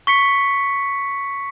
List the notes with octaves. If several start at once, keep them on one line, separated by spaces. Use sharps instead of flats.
C#6 B6 C#7